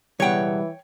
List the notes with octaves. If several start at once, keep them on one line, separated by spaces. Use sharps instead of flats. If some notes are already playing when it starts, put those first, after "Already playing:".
C#2 B2 E3 G3 C#5 F#5 G5